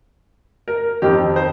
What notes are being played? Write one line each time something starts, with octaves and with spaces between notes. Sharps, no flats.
A#4
F2 D#3 G4
C5